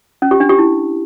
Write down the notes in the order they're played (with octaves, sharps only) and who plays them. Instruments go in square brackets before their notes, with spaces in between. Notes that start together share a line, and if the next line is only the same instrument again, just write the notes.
[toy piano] C#4
G4
D4
G4
E4